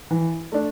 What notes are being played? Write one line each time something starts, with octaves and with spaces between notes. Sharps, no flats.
E3
A3 D4